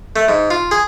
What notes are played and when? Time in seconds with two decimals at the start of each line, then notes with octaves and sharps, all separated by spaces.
0.16 A3
0.29 G#2
0.50 F4
0.71 G#4